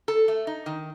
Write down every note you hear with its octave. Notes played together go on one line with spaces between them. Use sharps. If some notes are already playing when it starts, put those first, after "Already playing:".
A4
A3
D#4
D#3